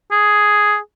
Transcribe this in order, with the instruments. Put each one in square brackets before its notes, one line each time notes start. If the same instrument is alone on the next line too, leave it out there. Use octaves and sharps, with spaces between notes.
[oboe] G#4